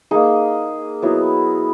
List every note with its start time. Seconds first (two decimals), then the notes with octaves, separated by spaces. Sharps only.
0.11 A#3 D#4 G#4
1.02 F#3 B3 E4